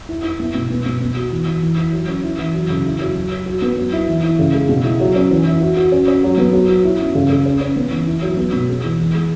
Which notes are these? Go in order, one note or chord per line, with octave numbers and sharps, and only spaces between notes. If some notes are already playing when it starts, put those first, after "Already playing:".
E4
E4
B3
B2
B3
B2
B3
F#4
E3
E3
E3
E4
F#3
C#4
E4
E3
F#3
C#3
E4
F#3
F#4
F#3
F#4
B3
F#3
E4
E3
E4
C#3
G#3
B2
E4
F#3
C#4
E3
E4
F#4
F#4
C#4
C#4
F#3
B3
F#3
F#4
E4
C#4
C#3
C#3
C#4
C#4
B3
E3
E4
F#3
B3
B2
G#3
E3
E3
G#3